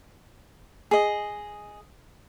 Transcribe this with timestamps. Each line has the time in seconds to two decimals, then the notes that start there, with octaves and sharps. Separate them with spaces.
0.91 G#4 D#5